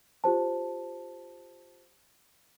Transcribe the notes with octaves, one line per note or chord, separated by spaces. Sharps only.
F4 G4 C5 A5